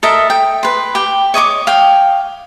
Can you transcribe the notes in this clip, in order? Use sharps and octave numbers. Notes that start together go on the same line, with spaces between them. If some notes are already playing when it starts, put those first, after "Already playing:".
A4 A#4 D#5 E5
G5
B4 C6
G4 G5
C#5 D#5 C#6 D6
F5 G5